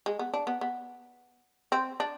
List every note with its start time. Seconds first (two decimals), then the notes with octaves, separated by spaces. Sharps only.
0.06 G#3
0.19 B3
0.34 D4
0.47 B3
0.61 B3
1.72 C4
2.00 D4